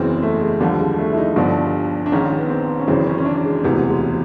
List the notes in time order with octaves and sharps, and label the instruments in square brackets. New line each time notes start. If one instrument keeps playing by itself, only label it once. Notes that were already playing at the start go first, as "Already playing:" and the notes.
Already playing: [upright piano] F#1 E2 C#3 E3 C4
A3
G#3
D#2 D3 F3 G3
G#3
A3
E4
D#4
G1 G2 D3 F3 D4
D4
A#1 G#2 D#3 C#4
B3
C4
C#4
G#1 F#2 C#3 E3 C4
C#4
C#4
D4
G#3
E1 D2 C3 E3 G#3
G#3